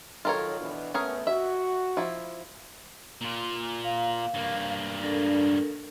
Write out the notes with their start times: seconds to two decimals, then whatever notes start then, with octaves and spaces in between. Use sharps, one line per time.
0.25 D#3 F#3 F4 A4 A#4 C#5
0.59 B2 E3 D4
0.94 A3 B3 C#4 G#4 A#4
1.27 F#4 E5
1.97 F3 E4
3.21 A#2 F4
3.84 F5
4.34 G2 A#3
5.02 D4 A4 A#4